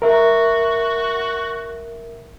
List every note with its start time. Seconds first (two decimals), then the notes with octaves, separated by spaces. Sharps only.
0.02 F#4 A#4 E5